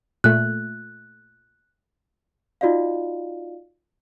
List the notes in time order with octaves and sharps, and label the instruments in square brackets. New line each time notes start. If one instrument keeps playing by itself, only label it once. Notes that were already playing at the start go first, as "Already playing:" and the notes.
[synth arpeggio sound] A#2 A3 [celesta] F#6
[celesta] D#4 F4 F#4 D5 D#5 F5